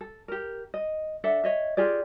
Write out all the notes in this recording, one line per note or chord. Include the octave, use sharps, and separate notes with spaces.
A4
G4 A#4
D#5
D4 A4 E5 F#5
C#5 D#5 E5
F4 G4 G#4 D5